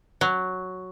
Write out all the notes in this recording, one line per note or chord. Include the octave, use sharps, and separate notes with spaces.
F#3